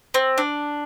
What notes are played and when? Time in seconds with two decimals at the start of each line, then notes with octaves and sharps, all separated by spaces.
0.14 C4
0.38 D4